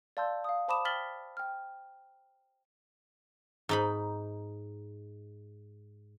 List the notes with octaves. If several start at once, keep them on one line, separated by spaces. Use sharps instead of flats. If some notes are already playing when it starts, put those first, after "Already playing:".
D5 F5 A5 C6 E6 G6
F5 D#6
C5 A5 B5 D6 D#6 E7
G5 F6 A6 B6 F#7 G7
G5 F6
G#2 D#4 B5